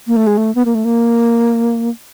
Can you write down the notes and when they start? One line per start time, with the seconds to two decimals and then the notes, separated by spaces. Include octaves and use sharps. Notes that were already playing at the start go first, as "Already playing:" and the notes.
0.07 A#3
0.17 A3
0.27 G#3
0.37 A3
0.55 B3
0.65 A#3
0.75 A3
0.85 A#3